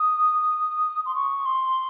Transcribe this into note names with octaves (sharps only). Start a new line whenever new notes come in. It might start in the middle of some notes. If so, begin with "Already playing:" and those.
Already playing: D#6
C6
C#6
C6